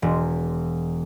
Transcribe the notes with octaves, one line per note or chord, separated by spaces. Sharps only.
E1